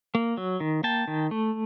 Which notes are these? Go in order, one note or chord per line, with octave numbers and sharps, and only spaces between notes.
A#3
F#3
D#3
A#3 G5 A5
D#3
A3